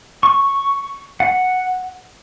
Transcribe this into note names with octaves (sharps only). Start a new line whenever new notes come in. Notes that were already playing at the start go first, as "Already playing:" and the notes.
C#6
F#5